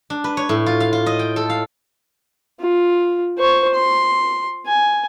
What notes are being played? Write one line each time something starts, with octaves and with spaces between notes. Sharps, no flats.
D4
B4
C#5
A2
F4
F5
F4
D#5
G5
A4
F5
F4
C5 C#6
C6
G#5